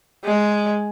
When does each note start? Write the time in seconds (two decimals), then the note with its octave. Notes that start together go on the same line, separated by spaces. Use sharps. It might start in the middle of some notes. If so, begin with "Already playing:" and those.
0.24 G#3